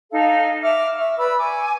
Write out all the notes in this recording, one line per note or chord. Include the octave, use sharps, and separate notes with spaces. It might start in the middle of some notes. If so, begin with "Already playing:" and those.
D#4 A4 F5
E5 D6 F6
E5 C#6
B4 D5 B5 E6
G#5 C#6 D6